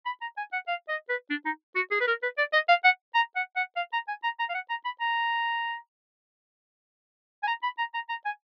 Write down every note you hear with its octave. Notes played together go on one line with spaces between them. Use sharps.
B5
A#5
G#5
F#5
F5
D#5
B4
D4
D#4
F#4
G#4
B4
A#4
B4
D5
D#5
F5
F#5
A#5
F#5
F#5
F5
A#5
G#5
A#5
A#5
F5
F#5
A#5
B5
A#5
G#5
A#5
B5
A#5
A#5
A#5
G#5